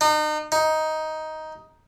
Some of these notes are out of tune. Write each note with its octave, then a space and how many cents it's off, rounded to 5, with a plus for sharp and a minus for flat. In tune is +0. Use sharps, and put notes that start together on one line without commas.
D#4 -35
D#4 +10